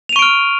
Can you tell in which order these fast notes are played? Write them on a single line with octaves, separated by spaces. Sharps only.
F7 D#7 C#6 D7 F6